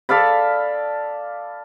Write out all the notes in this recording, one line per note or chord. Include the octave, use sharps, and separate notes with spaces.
A4 D5 F5 B5